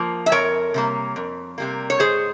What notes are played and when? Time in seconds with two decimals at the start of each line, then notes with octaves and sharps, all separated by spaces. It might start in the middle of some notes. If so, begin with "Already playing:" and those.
Already playing: F3 A#3
0.26 E5
0.32 F2 A#4 C#5
0.74 C3 G3 A#3
1.16 F2
1.58 C3 G3 A#3
1.90 C#5
2.00 G#2 G#4 C5